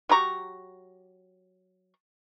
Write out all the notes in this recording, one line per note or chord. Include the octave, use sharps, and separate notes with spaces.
F#3 G4 A#5 C#6